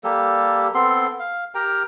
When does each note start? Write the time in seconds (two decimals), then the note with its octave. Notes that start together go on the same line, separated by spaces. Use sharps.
0.04 G3 A#3 G4 A4
0.75 B3 C4 A4 C6
1.19 F5
1.55 G4 A#4 G5 A#5